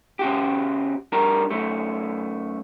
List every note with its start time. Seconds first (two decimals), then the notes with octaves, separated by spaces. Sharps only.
0.19 C#3 F#4 G4
1.12 G3 D4 A#4 A#5
1.50 F#2 A3